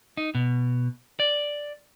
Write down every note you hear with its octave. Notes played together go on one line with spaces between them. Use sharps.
D#4
B2
D5